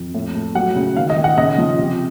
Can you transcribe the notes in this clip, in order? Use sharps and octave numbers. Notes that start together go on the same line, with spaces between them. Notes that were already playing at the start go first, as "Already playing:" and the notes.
Already playing: F2
A2
A3
F#3 F#5
C#3
D#3 F5
D#5
D#3
F#5
C#3 D#5
F3
C3